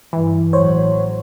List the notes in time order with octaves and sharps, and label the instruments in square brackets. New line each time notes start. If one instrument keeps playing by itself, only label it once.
[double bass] G2 [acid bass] E3
[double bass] A1 F#3 [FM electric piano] C5 C#5